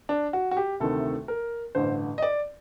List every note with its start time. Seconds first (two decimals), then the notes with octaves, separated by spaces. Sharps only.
0.09 D4
0.33 F#4
0.51 F#4
0.57 G4
0.80 D2 C3 D#3 A3 A4
1.28 A#4
1.75 A1 G2 D3 C5
2.18 D#5
2.22 D5